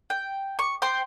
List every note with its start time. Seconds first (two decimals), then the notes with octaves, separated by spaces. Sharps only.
0.10 G5
0.59 C#6
0.82 C5 G5 C6